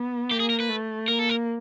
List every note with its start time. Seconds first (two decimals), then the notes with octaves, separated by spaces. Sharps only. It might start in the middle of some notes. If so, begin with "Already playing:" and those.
Already playing: B3
0.31 A#3 G4
0.40 G#4
0.50 A#4
0.60 B4
0.69 A3
1.08 A#3 A#4
1.19 A4
1.29 A#4